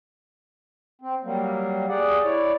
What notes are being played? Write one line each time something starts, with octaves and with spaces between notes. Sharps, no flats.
C4
F#3 G3 A#3
G4 G#4 D5 F#5
E4 C#5 D5